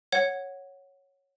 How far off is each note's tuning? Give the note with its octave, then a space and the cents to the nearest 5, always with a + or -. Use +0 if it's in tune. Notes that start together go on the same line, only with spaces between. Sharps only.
C#5 -5 F#5 +0